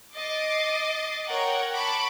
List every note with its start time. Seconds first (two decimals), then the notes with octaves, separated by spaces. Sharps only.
0.16 D#5 D6 A6 C7
1.27 A#4 C#5 F#5 G5
1.75 A5 B5 C#6 D6